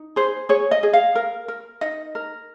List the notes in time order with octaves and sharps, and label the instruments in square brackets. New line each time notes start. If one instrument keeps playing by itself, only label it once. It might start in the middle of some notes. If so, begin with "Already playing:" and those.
Already playing: [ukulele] D#4
G#4 C5
G#4 C#5
D#5
G#4
F5
A#4
A#4
D#4 D#5
A#4